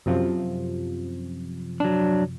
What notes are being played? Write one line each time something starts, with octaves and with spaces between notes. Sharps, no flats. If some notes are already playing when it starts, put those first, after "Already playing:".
F#2 C3 F3
F#3 D4